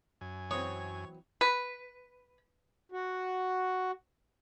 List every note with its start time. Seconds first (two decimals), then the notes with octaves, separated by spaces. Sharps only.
0.21 F#2 G#5
0.51 E3 F#3 C4 C#5 D#6
1.41 B4
2.92 F#4